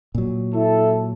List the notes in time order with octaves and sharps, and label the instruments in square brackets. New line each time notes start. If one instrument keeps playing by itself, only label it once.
[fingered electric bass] A#2 F#3
[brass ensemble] E4 A4